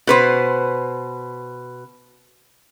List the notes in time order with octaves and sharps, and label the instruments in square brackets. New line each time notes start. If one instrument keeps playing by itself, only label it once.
[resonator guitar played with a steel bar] B2 B4 C5